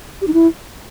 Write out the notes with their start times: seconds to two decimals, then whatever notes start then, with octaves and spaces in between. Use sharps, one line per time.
0.21 G4
0.27 D#4
0.33 E4